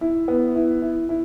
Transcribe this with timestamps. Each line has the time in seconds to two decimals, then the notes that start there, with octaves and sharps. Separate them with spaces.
0.01 E4
0.28 B3
0.55 E4
0.82 E4
1.09 E4